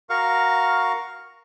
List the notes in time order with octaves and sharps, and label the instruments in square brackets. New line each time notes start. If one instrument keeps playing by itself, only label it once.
[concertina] F#4 A#4 F5 C#6